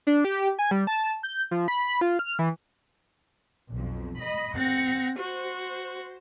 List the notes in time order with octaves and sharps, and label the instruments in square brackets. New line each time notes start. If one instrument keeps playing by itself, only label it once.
[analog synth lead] D4
G4
G#5
G3
A5
G6
F3
B5
F4
F6
E3
[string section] B1 F2
D#5 B5
[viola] C4 [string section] F#5 A#6 C#7
[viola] F#4 [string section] C5